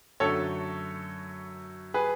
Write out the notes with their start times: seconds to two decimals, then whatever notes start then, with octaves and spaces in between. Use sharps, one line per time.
0.20 F#2 D3 F#3 A3 A4 C#5
1.94 G#4 B4